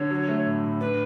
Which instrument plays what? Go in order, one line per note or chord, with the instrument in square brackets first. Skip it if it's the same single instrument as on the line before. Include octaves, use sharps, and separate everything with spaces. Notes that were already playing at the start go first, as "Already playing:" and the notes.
Already playing: [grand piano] D3 [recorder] C#5
[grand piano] F#3
A3
A2
A2
[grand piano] D4 [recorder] B4